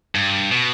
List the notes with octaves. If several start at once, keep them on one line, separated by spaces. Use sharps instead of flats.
G2
B2